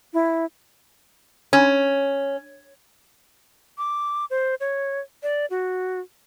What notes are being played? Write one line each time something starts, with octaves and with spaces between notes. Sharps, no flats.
E4
C#4
D6
C5
C#5
D5
F#4